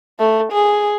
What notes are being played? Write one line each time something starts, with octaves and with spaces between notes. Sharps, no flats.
A3
G#4